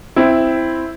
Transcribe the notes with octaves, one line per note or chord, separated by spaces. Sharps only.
C4 E4